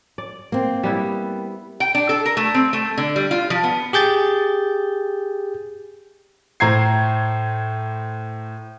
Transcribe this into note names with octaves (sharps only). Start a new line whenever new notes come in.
D5
A#3 C4
G3 B3 E4
G5
D4
A4
A#4
A3
C4
A3
D3
G3
F4
F3
B3
G4 G#4 G6 A6
A2 C5 A#5 G#6 C7